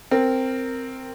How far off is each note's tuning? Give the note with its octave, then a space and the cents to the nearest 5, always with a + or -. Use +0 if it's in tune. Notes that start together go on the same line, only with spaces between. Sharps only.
C4 +0 A#4 -10